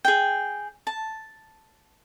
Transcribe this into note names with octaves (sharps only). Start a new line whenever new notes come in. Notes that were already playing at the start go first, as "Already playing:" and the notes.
G#4 G5
A5